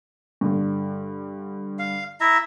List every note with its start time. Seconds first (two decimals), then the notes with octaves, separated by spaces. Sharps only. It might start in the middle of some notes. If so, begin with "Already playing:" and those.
0.41 G2 D3
1.79 F5
2.21 E4 E5 A#5